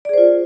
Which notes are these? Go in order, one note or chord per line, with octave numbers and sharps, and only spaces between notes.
F4 G#4 C5 D5